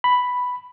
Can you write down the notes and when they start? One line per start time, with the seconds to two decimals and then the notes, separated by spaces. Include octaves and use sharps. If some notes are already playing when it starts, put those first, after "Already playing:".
0.04 B5